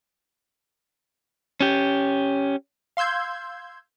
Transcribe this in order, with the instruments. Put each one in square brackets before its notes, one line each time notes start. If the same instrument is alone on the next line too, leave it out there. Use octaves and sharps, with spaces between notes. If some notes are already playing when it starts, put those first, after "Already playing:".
[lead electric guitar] C#4 G4
[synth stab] F5 C6 E6 G6 G#6